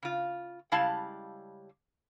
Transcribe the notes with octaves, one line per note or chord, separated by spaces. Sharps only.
C#3 F4
C#3 G3 G#3 E4 F5 A5